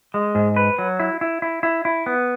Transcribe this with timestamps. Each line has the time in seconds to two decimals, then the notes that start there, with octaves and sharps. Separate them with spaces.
0.14 G#3
0.35 G#2
0.56 B4
0.79 F#3
1.00 E4
1.21 E4
1.42 E4
1.63 E4
1.85 E4
2.06 B3